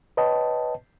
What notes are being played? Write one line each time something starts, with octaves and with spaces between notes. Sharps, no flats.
B4 C#5 D#5 G5 A5